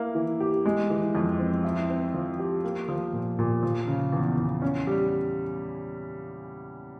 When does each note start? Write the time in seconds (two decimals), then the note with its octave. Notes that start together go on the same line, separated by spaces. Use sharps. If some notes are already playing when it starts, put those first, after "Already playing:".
Already playing: A#3 E4
0.15 E3
0.40 G4
0.66 G#3
0.90 E3
1.15 F2
1.39 C4
1.65 E4
1.89 C4
2.14 F3
2.39 G4
2.64 A#3
2.89 F3
3.13 A#2
3.39 A#2
3.63 F3
3.87 C#3
4.13 E2
4.37 E2
4.62 C#4
4.87 G3